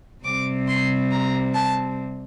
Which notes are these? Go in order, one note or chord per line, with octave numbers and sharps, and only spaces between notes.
C3 G3 C4 D6
C6
A#5
A5